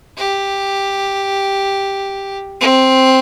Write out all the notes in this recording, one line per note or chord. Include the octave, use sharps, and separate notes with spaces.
G4
C4